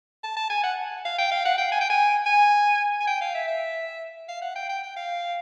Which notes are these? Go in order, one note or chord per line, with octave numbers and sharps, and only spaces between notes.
A5
A5
G#5
F#5
F5
G5
F5
F#5
G5
G#5
G5
G#5
G#5
G#5
G5
F5
E5
E5
F5
F#5
G5
G5
G5
F5